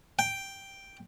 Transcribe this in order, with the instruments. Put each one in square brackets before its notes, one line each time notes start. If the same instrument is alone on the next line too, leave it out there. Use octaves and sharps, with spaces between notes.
[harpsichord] G5